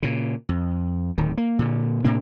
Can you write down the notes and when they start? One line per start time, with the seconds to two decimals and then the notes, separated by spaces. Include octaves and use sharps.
0.03 A#2 C#3
0.49 F2
1.18 D1 D#3
1.38 A#3
1.59 A#2 D3
2.04 A2 C3 A#3 D4